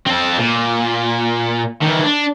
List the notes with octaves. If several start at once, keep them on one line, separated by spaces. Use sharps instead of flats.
C4 A4
A#2
D#3 E3
D4